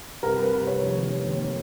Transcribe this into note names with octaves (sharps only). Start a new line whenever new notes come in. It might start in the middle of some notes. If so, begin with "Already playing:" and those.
C2 A#4
C2 B4
C2 B4
C2 C#5
F1
D#2
D#2
D#2